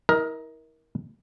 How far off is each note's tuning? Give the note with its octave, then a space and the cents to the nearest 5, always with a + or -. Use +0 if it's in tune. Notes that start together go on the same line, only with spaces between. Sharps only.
E4 -40 A#4 +15 D#5 +0